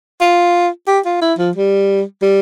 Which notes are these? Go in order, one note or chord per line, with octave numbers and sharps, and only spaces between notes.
F4
G4
F4
E4
F3
G3
G3